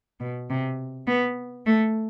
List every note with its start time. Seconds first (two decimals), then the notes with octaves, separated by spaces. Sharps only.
0.20 B2
0.50 C3
1.08 B3
1.66 A3